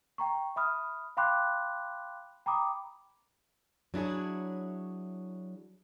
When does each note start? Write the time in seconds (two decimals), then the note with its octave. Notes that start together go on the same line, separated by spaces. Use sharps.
0.18 G5 A#5 C#6
0.56 E5 B5 D#6 F6
1.17 F5 G5 B5 C6 D6 F#6
2.46 G5 A#5 B5 D6 D#6
3.94 F#3 D4 E4 G#4 C#5